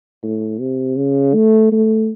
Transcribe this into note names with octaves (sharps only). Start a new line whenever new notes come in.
A2
C3
C#3
A3
A3